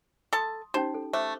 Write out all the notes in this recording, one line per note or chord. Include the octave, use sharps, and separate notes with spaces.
A4 A5 C6 D#6
C#4 D#4 G4 C5
A4
A3 C5 C#6 D6